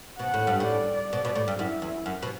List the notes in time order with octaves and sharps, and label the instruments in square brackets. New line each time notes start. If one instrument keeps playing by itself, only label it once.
[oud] B2 [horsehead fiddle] F#5
[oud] A2
G2
A2
[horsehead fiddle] D5
[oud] B2
B2
A2
G2
[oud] F#2 [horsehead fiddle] E4
[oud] E2
F#2
B2